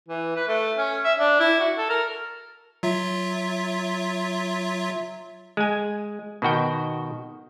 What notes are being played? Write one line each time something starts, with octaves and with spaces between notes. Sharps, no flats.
E3
B4
A3
C#4
E5
D4
E4
F#4
A4
A#4
F#3 F4 E5
G#3 G#5
B2 D#3 F#4 G5